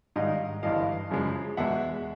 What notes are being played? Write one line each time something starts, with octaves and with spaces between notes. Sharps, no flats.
G#2 D#3 G3 D#5 F5
G1 G2 E3 D#5 F5
F#2 C#3 F3 G#3
E2 B2 G#3 E5 F#5